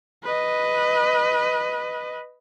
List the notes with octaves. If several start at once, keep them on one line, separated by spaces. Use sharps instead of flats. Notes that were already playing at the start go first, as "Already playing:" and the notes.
B4 D#5